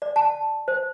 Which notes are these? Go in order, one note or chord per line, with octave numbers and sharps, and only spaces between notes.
D5
A5
C5